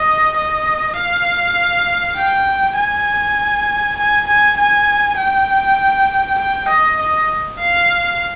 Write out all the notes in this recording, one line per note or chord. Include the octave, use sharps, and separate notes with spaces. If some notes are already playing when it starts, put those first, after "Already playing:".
Already playing: D#5
D#5
F5
G5
G#5
G#5
G#5
G#5
G5
G5
D#5
D#5
F5